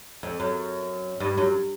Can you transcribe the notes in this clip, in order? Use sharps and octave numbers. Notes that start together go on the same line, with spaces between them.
F2
F#2
G2
F#2